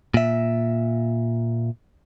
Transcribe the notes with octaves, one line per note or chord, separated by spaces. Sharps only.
A#2 E5